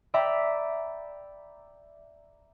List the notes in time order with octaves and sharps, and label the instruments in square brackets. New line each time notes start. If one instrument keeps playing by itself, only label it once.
[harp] D5 E5 G5 A#5 B5